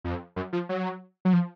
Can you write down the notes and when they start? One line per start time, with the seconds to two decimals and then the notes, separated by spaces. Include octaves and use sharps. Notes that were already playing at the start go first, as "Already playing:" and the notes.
0.04 F2
0.36 F#2
0.53 F3
0.69 F#3
1.25 F#3
1.33 F3